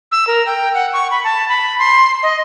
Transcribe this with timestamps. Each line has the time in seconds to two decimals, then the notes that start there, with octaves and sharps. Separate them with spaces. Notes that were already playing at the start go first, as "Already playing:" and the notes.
0.12 E6
0.27 A#4
0.46 G5
0.74 F#5
0.93 C#6
1.11 B5
1.24 A5
1.49 B5
1.79 C6
2.23 D#5